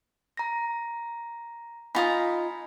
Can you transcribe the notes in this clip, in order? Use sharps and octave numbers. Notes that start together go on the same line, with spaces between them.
A#5 A#6
D#4 F4 G#5 B5 D#6 B6